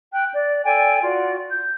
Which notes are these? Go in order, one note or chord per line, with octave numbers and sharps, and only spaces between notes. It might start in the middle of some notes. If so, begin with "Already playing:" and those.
G5 F#6
D5
A4 D5 G5 G#5
F4 F#4 D5
G6